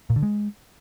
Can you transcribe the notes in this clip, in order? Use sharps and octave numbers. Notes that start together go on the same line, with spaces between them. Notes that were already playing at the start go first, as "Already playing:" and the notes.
A#2
D3
G#3